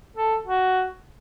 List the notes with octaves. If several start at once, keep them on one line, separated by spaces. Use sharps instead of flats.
A4
F#4